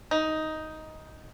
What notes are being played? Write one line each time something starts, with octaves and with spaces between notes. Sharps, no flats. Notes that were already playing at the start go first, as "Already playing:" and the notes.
D#4